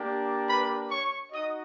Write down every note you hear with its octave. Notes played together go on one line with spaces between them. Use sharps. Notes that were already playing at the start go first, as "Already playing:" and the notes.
Already playing: A#3 D4 G4
B4 B5
C#5 C#6
D#4 F#4 D#5 D#6